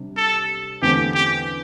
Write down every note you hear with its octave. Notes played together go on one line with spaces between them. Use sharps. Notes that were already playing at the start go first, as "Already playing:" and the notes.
Already playing: C3 G3 D4
A4
E2 D3 A3 C4 G4
G4